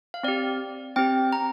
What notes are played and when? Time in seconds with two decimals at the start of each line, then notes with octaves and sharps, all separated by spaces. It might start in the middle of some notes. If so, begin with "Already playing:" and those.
0.14 F5
0.23 C4 G4 D5
0.96 C4 G4 G5
1.33 A#5